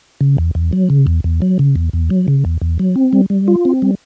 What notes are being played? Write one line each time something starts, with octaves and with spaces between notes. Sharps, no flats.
C#3
E2
E2
F#3
C#3
E2
E2
F#3
C#3
E2
E2
F#3
C#3
E2
E2
F#3
C4
G3
G3
F4
C4
G3